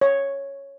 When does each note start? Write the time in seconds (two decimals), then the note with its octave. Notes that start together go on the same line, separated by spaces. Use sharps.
0.01 C#5